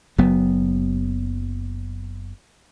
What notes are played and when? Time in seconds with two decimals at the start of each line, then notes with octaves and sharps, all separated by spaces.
0.18 F#1 F#3 B3